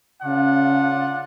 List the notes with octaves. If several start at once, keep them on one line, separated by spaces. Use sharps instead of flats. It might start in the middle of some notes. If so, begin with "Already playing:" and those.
C#3 D4 F4 F#5